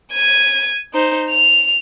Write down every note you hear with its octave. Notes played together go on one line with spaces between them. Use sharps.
G#6 D#7
D#4 C5
F7